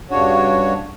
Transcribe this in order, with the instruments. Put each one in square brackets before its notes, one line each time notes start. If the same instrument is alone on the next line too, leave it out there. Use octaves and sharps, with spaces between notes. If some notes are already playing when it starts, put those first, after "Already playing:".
[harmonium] G2 C#3 D4 F#4 C#5